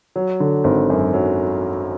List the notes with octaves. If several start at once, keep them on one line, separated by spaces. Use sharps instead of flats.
F#3
D3
G#1
F#2
F#3